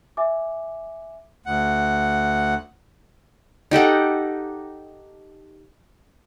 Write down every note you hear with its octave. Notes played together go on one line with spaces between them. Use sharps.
E5 G#5 D6
D2 F#5
D#4 G4 A4 F#5